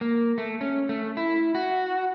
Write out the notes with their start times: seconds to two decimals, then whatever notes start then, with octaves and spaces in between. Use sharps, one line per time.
0.01 A#3
0.38 A3
0.61 C#4
0.89 A3
1.17 E4
1.55 F#4